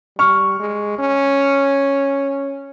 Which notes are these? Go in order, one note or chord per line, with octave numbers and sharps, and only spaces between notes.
G3 C#6 F6
G#3
C#4